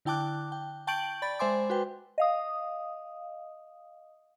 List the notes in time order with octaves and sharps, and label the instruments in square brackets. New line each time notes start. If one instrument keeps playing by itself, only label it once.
[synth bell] D3 E4 G5 A5 D6 F#6
G5
G5 A5 C#6 G6 D7 F#7
D5 B5 A6
G#3 C5 E5 G#5 C6 D6
F#4 B4 G5
D#5 F5 D#6